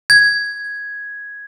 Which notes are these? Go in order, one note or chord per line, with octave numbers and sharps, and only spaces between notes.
G#6